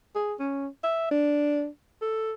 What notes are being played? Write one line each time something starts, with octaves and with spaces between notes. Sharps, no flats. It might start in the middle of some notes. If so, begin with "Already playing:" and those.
G#4
C#4
E5
D4
A4